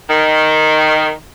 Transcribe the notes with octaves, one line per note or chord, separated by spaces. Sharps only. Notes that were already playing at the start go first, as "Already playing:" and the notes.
D#3